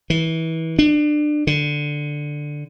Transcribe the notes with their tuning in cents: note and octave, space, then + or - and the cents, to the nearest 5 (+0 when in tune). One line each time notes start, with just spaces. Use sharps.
E3 -25
D4 +25
D3 +5